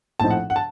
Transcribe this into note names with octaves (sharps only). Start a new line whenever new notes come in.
A#1 A2 F3 C4 D#4 A5
F#5
F#5
A5